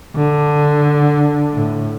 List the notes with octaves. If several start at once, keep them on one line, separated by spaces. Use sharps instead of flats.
D3
A2